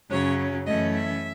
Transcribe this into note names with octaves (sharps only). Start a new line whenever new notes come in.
F#2 C#3 F#3 C#4 C#5
F#2 E3 A3 C#4 D#5
E5